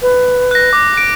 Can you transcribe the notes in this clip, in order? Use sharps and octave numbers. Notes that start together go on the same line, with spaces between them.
B4
F#6 A#6
D6
D7